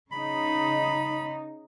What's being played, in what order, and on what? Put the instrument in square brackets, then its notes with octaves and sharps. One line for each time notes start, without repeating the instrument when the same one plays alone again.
[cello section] C#3 D#4 [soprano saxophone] B5